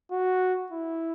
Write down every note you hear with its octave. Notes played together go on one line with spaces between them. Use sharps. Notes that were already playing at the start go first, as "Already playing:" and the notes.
F#4
E4